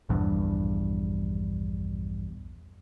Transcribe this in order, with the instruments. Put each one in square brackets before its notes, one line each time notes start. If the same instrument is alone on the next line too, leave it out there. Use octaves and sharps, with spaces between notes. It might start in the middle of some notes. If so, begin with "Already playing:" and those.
[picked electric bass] A#1 E2 G2